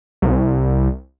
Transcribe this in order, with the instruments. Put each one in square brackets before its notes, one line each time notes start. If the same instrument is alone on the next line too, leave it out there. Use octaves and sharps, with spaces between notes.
[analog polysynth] C2